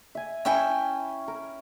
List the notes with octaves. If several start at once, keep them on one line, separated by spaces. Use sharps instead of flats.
E5 G#5
C#4 E4 E5 G5 G#5
A#4